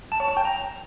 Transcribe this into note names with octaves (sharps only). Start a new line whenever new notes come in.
A5
C#5
A5
G5
A#5